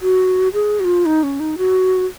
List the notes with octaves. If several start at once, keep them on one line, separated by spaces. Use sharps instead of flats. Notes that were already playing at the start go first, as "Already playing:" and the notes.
F#4
G#4
F#4
F4
D#4
C#4
D#4
F#4